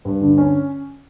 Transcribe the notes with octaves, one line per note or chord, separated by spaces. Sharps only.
G2
D3
C#4